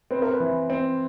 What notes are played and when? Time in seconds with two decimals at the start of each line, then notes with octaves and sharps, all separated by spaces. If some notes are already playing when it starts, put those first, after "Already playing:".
0.11 C4 B4
0.22 A#4
0.34 B4
0.40 E3
0.70 C4